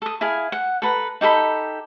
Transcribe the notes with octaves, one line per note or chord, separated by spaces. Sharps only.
A4 D#6
E4 G#4 F5 G#5
F#5
A4 B4 A#5
D#4 G4 A4 B5